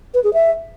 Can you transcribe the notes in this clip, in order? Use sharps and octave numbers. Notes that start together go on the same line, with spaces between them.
B4
G#4
E5